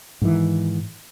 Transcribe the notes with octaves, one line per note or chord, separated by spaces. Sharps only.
G#2 D#3 E3